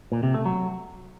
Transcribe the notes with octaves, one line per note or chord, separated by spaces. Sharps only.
A#2
C3
A3
F#3